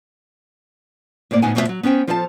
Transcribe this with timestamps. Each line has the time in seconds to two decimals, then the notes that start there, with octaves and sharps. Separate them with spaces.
1.31 A2 C3 A#3 D5
1.42 D2 A2 B3 D#4 F#5 G#5
1.55 F2 B2 A3 F4 G4 E5
1.69 F#3
1.83 B3 C#4 C5 G5
2.07 F3 F4 A4 C5 E5 A5